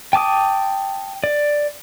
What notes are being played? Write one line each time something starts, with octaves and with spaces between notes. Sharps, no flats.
G5 A5 D6 D#6
D5